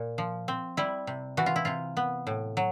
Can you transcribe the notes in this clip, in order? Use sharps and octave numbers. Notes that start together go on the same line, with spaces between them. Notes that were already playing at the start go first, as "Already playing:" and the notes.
Already playing: A#2
F3
C4
G3 E4
C3
E3 F#4
F4
E4
C3 F4
B3
A2
F#3